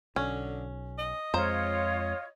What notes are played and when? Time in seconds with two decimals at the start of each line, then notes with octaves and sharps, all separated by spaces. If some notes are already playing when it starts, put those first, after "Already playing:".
0.16 B1 D3 C#4
0.99 D#5
1.34 F2 G#3 F4 C5 C#5 A#5